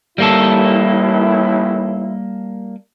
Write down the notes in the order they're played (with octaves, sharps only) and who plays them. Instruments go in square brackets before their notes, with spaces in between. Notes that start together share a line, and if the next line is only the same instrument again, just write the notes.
[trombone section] A1 D#2 E4 [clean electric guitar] G3 A#3 A4